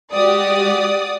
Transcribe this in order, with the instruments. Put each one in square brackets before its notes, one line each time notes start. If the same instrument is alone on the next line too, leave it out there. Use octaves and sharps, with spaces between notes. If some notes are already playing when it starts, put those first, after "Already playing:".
[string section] G#3 F#4 G4 [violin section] D5 F#5 D#6